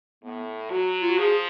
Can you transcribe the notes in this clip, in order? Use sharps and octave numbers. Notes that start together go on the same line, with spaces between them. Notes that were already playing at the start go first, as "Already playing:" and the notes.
A2 B3
F#3 F#4
F4
F#4
F3 G#4